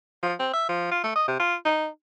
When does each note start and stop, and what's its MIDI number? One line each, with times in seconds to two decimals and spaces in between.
0.23 0.34 53
0.40 0.51 60
0.54 0.66 76
0.69 0.88 53
0.91 1.03 65
1.03 1.12 57
1.16 1.23 75
1.28 1.38 48
1.40 1.55 65
1.65 1.87 63